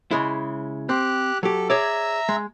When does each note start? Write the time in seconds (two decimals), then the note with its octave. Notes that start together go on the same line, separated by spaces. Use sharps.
0.11 C#3 G#3 E4
0.89 C4 G4 F#6
1.43 F#3 G4 A4
1.70 G#4 C#5 D5 E5 A#5 E6
2.29 G#3